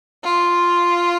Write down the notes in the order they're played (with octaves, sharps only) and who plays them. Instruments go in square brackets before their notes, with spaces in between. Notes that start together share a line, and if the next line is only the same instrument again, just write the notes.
[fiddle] F4